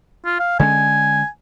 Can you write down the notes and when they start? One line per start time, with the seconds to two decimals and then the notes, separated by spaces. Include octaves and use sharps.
0.25 F4
0.40 F5
0.59 D3 G#3 C#4 G#5